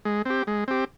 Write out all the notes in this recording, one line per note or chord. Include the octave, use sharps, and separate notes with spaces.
G#3
C4 G4
G#3
C4 G4